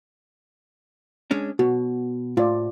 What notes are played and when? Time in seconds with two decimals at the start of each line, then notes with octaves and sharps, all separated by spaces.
1.31 G#3 C#4 D4
1.59 B2 F#4
2.37 A2 F4 D5